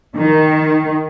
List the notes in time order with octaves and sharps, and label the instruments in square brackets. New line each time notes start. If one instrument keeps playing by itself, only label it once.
[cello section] D#3